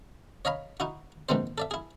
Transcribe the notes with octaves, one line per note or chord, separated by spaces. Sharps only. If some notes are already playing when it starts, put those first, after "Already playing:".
C#5 D#5 F5 A#5 B5
D#4 E4 F#4
A#1 G#2 E3 G#3 C4 C5
A4 D5 E5
E4 G#4